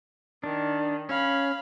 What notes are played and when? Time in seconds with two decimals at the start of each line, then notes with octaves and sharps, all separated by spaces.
0.44 D#3 D4
1.09 C#4 F5 B5